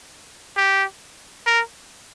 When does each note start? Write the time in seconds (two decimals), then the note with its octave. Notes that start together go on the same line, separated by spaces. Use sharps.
0.57 G4
1.46 A#4